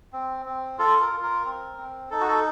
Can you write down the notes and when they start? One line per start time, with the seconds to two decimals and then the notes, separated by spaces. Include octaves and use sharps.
0.13 C4
0.46 C4
0.79 F4 A4
1.01 A#4
1.13 F4
1.23 A#4
1.45 C4
1.78 C4
2.10 D#4 A4
2.21 F#4
2.28 A4